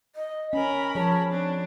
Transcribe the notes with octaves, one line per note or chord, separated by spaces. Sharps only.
D#5
C#4 A#4 G#5 B5
F3 G#4 C#5 A5
C4 D4